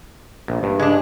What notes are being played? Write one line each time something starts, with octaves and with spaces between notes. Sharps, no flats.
A#1
G2
G#3 D4